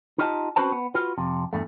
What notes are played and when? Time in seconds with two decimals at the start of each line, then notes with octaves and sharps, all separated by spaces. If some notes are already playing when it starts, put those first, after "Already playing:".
0.18 D#4 F4 G4 D#5 F5 A5
0.56 C4 C#4 F#4 B4 C5 A5
0.72 B3
0.94 F4 F#4 B4
1.18 F2 C3
1.53 E2 G2 A3